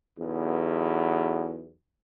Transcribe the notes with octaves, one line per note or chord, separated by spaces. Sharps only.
B1 E2